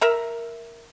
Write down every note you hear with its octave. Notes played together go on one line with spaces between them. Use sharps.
A#4 E5 A#5